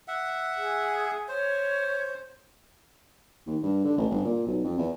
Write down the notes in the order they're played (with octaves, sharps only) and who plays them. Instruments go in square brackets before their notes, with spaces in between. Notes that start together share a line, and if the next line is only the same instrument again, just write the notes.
[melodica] E5 F#5
[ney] G#4
[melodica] C5 [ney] C#5
[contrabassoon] D#2
G2
D3
A1
G1
A#2
B1
F2
E2